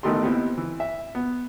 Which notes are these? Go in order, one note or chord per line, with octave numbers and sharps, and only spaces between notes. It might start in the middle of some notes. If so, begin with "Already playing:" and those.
A1 D#3 A3 B3 D#4 C6
D#2 B3 C4 E4
E3
E5
B3